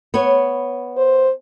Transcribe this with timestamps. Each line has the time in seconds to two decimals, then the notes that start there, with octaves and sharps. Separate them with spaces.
0.14 B3 C#5
0.97 C5